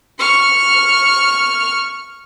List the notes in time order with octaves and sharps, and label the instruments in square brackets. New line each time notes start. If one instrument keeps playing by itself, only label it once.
[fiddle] C#6 F6